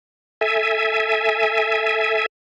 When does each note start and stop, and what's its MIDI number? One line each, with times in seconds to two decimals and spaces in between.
0.41 2.26 69
0.41 2.26 76
0.41 2.26 80